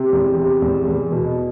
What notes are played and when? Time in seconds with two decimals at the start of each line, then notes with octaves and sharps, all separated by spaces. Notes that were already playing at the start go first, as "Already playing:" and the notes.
Already playing: C3
0.13 E2
0.38 C3
0.62 E2
0.87 E2
1.12 B2